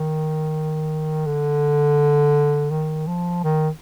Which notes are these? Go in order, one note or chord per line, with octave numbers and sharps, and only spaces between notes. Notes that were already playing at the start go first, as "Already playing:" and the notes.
Already playing: D#3
D3
D#3
F3
D#3